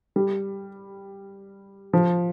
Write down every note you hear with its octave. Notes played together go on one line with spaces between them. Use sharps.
G3
F3